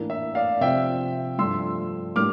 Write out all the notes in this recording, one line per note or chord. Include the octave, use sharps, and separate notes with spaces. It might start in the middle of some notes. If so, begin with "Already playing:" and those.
Already playing: A2 E3 A#3 D4
E5
D5 F5
C3 F3 C4 E5 G5
G2 F3 A3 D4 C6 E6
A2 G3 A#3 D4 D6 F6